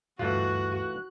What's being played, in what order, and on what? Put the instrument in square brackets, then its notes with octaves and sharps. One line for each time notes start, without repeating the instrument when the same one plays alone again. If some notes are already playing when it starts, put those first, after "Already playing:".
[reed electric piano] D2 G2 F5 [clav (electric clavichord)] E3 A3 F4 [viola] F#4 [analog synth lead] F#6